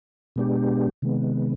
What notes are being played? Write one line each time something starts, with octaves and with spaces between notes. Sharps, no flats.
B2 G#3 B3 D4 G4
C3 D#3 G#3 B3